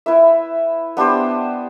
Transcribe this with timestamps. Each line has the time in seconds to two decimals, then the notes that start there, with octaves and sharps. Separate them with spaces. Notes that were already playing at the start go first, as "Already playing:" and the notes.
0.06 E4 B4 E5
0.97 B3 D4 G4 C5